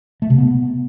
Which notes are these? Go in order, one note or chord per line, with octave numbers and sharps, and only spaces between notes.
A3
C3
B3